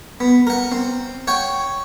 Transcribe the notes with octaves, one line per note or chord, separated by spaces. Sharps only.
B3
A#4 F#5
C4
C#5 F#5 G5